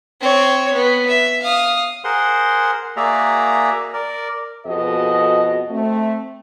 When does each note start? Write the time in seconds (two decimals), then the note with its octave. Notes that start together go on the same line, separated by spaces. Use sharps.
0.21 C4 C#5
0.73 B3
1.08 E5
1.41 F5 D#6
2.04 G#4 A#4 C5 F#5 C6
2.96 A#3 F#4 G#4 D5 E5 A#5
3.93 A#4 D5
4.65 F2 B2 F#4 G#4 A4 D#5
5.70 A3 C4